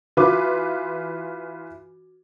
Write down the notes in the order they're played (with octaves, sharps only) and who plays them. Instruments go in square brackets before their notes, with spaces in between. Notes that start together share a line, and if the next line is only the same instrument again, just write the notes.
[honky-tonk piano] E3 F4 B4 [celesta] F#4 D6